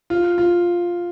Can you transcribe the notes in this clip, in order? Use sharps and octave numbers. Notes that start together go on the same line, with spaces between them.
F4
F4